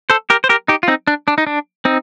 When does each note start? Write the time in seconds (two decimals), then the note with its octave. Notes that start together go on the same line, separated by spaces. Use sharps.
0.10 A4 C5
0.30 G4 A#4
0.44 C5
0.49 G4 A#4
0.68 D#4 G4
0.83 F4
0.88 C4 D#4
1.07 D4
1.28 D4
1.38 D#4
1.47 D4
1.85 C4 D#4